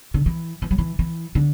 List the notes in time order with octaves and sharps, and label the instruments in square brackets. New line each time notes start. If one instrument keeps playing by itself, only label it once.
[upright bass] D3
E3
E3
F#3
E3
E3
D3